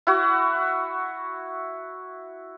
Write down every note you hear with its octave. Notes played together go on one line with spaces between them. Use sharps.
E4 F#4